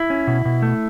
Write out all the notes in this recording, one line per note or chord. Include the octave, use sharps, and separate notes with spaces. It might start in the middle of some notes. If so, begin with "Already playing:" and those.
Already playing: E4
C#4
B2
B2
A3